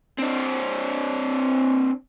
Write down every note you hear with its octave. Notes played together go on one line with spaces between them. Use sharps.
C4 D4